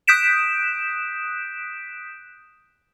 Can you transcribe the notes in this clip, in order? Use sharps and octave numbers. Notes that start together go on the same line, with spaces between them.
D#6 F#6 G6 B6 D7 E7